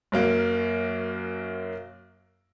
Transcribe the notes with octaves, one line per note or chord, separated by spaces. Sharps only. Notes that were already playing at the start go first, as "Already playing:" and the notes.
F#2 F#3 A#3